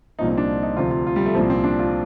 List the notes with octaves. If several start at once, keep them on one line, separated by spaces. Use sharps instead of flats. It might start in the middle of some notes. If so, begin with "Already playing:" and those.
C2 A#2 F3 D#4
C4
D4
D#4
D2 C3 F3 F4
F4
F4
G3
A3
C2 A#2 F3 C4
C4
D4
F4